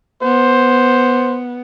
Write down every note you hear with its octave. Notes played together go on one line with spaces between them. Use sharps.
B3 C5